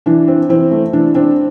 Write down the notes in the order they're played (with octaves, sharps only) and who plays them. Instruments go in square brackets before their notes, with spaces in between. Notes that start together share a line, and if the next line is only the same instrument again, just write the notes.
[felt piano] E3 D4
C4
E3 C4
A3
E3 D4
C4 D4